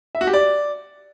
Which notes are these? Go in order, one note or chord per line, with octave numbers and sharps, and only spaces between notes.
E5
F#4
G4
D5